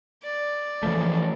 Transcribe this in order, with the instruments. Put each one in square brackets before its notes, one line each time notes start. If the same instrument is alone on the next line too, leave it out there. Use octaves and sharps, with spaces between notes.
[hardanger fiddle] D5
[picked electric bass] E3 F3 A3